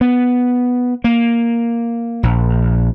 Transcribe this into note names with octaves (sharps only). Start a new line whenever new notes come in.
B3
A#3
A#1